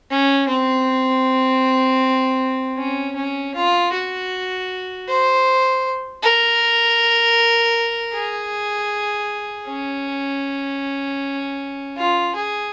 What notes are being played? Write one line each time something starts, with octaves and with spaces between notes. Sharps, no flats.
C#4
C4
C#4
C#4
F4
F#4
C5
A#4
G#4
C#4
F4
G#4